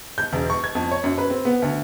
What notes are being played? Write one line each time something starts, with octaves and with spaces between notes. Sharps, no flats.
G6
E1
C#6
G#6
F2
C#5
F#2
B4
C4
B3
D2